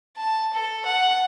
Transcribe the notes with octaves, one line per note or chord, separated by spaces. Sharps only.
A5
A4
F#5